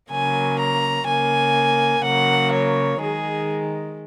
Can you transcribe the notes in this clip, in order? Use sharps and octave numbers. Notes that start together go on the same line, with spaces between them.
C#3 F#3 A#3 G#5
A#5
C#3 A#3 G#5
C#3 F#3 A#3 F#5
C#5
D#3 G#3 G#4